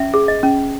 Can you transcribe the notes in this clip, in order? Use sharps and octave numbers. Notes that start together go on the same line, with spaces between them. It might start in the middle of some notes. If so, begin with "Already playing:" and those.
Already playing: C#4 E5
G#4
D#5
C#4